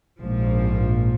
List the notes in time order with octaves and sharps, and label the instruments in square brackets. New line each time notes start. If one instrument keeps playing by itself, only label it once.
[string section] A#1 G#2 F3